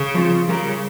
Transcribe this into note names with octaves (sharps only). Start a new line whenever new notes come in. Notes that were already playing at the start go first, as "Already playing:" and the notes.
Already playing: C#3
F3 C4 F4 C5
C#3 G3 C#4 F4 A#4